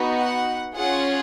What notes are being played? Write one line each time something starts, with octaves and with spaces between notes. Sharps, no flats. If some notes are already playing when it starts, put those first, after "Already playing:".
Already playing: B3 D#4 F#4
F#5
C#4 F4 G#4 F#5